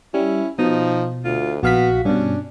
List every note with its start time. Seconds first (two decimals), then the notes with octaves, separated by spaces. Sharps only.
0.14 G3 C#4 E4
0.59 B2 F3 D#4
1.24 D2 F4
1.63 A#1 B3 F#4 F5 B6
2.05 G2 B2 C#4 D4